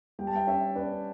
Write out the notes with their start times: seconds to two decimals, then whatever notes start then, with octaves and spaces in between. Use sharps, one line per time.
0.19 G3 G5
0.27 A5
0.36 E5 G5
0.47 C#4 C#5 E5
0.75 C#4 B4 D5